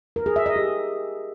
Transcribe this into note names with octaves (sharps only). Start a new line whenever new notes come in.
A#4
G#4
E5
D#5
G4